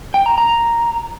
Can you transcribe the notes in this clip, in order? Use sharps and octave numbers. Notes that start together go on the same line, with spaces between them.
G5
A#5
A#5